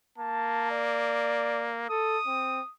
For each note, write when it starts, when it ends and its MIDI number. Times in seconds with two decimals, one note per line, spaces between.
0.18 1.86 58
0.18 0.67 81
0.70 1.72 74
1.90 2.18 69
1.90 2.71 87
2.27 2.60 60